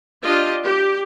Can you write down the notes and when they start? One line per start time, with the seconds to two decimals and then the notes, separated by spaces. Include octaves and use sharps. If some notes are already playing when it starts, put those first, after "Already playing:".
0.24 D4 F4 G4 D#5
0.65 G4